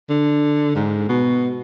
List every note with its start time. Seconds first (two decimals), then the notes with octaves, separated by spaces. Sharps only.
0.10 D3
0.75 G#2
1.09 B2